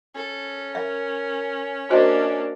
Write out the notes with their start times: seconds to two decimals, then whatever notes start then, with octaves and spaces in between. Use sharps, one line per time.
0.15 C#4 A4
0.75 A#4 E5
1.90 A#3 D4 F#4 C5 D#5